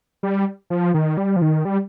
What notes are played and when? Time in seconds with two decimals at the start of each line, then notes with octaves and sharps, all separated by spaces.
0.23 G3
0.70 F3
0.94 D#3
1.17 G3
1.36 F3
1.42 D#3
1.65 G3